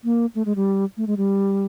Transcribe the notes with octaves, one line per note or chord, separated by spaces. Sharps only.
A#3
A3
G#3
G3
A3
G#3
G3